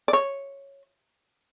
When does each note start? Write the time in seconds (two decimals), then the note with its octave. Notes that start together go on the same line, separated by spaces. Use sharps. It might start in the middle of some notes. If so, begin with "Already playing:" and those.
0.08 D5
0.13 C#5